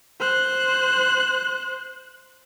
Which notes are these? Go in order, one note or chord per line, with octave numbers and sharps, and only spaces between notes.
C5 F#6